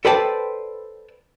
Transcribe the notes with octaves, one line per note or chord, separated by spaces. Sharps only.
A4 B4 C5 D5 G5 A5